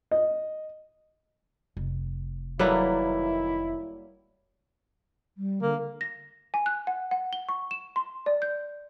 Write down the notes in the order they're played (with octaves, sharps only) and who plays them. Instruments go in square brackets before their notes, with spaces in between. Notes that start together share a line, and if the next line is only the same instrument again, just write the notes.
[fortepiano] D#5
[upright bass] F1
[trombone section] D#3 E4 [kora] F#3 A4 B4 [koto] G3 A#3
[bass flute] G3
[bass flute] D3 [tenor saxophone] A#3
[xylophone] A#6
G#5
F#6
F#5
F#5
G7
C#6
E7
C6
D5
G6